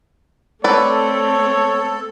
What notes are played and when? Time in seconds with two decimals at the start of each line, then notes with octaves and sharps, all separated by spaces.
0.64 A3 C4 A4 B4 C#5 D5